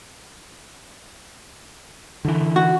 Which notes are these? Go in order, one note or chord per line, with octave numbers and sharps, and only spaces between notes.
D3 E3
F#4